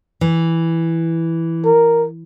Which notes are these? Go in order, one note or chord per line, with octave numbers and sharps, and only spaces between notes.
E3
A#4